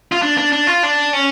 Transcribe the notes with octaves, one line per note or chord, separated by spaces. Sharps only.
F4
D4
D4
D4
F4
D4
C#4